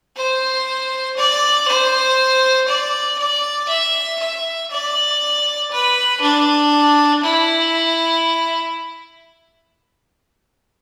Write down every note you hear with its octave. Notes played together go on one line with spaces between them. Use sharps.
C5
D5
C5
D5
D5
E5
E5
D5
B4
D4
E4